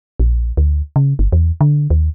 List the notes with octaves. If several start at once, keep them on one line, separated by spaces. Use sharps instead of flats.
A#1
D2
C#3
G1
E2
D3
D#2